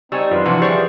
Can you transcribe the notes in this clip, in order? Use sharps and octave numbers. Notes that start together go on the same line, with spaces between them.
G3 C4 D#4 G#5 C#6 E6
F#2 D#3 F4 B4 F5
C3 E3 F3 D4 F#4
E3 F3 G3 G#4 C5 C#6